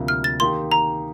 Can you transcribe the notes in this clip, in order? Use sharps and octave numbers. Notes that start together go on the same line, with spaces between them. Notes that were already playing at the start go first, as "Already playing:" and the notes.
Already playing: D2 C3 F3 A#3
F6
A6
D#3 A#3 D#4 G4 C6
A#5